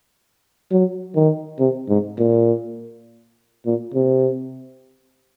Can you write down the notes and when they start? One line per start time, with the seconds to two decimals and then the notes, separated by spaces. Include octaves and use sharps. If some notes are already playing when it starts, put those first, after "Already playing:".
0.71 F#3
1.16 D#3
1.59 C3
1.89 G#2
2.18 A#2
3.66 A#2
3.94 C3